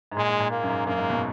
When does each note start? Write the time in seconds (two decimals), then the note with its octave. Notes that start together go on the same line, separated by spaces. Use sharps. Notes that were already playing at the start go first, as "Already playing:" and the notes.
0.12 G#2
0.17 A#2 G#3
0.28 G#2
0.40 A#2
0.51 A#3
0.63 F#2
0.69 G#2
0.86 F#2 A#3
0.98 G#2
1.10 B2